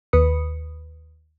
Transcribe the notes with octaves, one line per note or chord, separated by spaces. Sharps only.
D#2 B4 B5 D#6 C#7